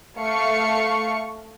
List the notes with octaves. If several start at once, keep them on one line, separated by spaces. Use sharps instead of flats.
A3 F5 C#6 C#7